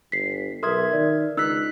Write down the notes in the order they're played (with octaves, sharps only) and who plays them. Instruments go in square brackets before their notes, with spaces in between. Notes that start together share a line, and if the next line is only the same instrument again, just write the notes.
[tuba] G1 [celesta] B6 C7
[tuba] B1 [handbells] A#4 E5 G#6 [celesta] C6 D#6
[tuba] D#3 [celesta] D5
[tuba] C#2 [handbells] D#4 F#6 B6 [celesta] E6